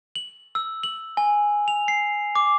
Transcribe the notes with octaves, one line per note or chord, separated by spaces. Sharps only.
F#7
E6
F#7
G#5
F7
C7
D6